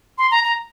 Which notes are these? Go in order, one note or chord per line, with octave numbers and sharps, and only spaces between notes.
C6
A#5
A#5